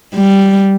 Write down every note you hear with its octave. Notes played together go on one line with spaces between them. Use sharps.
G3